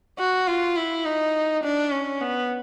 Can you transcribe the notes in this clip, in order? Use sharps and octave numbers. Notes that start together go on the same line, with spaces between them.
F#4
F4
E4
D#4
D4
C#4
B3